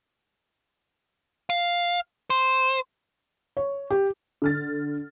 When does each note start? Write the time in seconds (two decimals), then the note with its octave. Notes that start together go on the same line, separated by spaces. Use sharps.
1.50 F5
2.30 C5
3.57 C#5
3.90 G4
4.42 D3 F6 A6